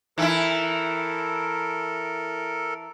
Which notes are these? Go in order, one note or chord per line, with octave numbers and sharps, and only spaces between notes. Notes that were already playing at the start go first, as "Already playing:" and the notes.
E3 E4 A4 A#4